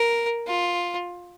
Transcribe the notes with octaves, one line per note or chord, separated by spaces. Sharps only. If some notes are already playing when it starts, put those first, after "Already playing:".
Already playing: A#4
F4